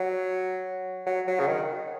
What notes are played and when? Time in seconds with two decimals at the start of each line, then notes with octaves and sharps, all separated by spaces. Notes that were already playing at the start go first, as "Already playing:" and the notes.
Already playing: F#3
1.06 F#3
1.27 F#3
1.40 C#3
1.47 D#3